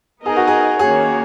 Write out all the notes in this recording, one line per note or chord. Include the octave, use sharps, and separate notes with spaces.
B3 D#4 G#4 A#4 D#5
F#4
G#4
D#3 A#3 C#4 F#4 G#4 C#5